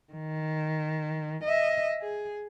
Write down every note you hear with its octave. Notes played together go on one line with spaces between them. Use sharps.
D#3
D#5 E5
G#4